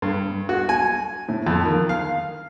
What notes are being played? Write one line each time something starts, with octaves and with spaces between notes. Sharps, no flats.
G2
F#4
G#5
A2
F2
D#3
F5